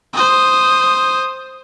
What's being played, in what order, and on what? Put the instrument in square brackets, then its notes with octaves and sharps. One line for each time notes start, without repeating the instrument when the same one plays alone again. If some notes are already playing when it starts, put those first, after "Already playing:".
[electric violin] C5 D#6